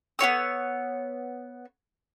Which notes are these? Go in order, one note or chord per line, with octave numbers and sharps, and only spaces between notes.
B3 F#4 C#5 E6